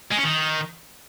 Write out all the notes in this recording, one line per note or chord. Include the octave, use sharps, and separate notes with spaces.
G#3
C#4
D#3